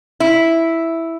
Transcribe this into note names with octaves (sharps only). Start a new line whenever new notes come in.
E4